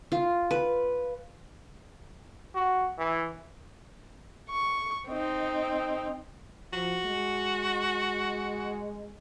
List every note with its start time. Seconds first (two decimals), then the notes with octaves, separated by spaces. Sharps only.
0.12 F4
0.51 B4
2.55 F#4
2.98 E3
4.50 C#6
5.08 C4 D#4
6.73 F3 F#4
7.06 G#3